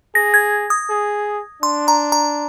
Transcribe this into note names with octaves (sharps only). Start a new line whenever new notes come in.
G#4 A#6
G#6
D#6
G#4
D4 C6
A#5
A#5